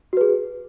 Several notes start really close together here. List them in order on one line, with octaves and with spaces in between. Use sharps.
F#4 B4 G#4